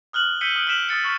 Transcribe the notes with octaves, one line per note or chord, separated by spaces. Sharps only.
D#6 F6 F#6 F#7 G7
E6 G6 B6 C#7 D#7 G7
D#6 F#6 D7 D#7
F6 F#6 B6 D7 E7 F#7
D#6 E6 A6 C#7
C#6 F6 B6 F#7